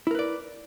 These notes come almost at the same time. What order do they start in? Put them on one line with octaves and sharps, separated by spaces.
E4 A#4 B4 D5